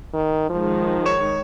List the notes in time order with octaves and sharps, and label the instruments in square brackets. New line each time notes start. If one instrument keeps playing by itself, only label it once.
[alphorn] D#3
[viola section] D#3 G#3 [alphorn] F3
[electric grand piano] C#5 C#6 E7